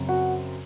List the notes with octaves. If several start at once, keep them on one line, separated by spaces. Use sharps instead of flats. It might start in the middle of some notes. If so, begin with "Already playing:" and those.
Already playing: F#2 C#3 C4
F#4 F#5